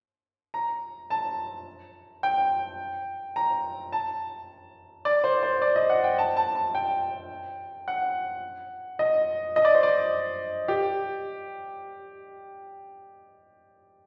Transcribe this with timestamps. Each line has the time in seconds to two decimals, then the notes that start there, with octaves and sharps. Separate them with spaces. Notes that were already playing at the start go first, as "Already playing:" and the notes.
0.54 A#5
1.10 A5
2.23 G5
3.36 A#5
3.92 A5
5.05 D5
5.24 C5
5.43 C5
5.62 D5
5.76 D#5
5.90 F#5
6.04 G5
6.18 A5
6.36 A5
6.55 A5
6.75 G5
7.88 F#5
8.99 D#5
9.56 D#5
9.65 D5
9.74 C5
9.83 D5
10.68 G4